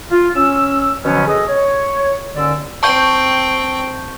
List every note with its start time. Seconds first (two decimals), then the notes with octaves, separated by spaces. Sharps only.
0.11 F4
0.36 C#4 E6
1.03 B2 D3 F3 F#3 B3 C#4
1.27 G#4 A4 D#5
1.48 C#5
2.36 D#2 D3 C#4 D5 E6
2.83 C4 G5 A5 C#6 G6